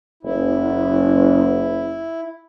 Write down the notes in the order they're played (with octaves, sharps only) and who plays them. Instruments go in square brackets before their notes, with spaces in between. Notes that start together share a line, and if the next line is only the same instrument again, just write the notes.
[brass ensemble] F#1 [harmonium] E4